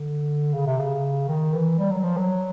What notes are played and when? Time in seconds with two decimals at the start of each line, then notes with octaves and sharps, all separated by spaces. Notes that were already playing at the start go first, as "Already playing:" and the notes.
Already playing: D3
0.53 C#3
0.66 C3
0.79 C#3
1.28 D#3
1.53 E3
1.78 G3
1.91 F#3
2.03 F3
2.17 F#3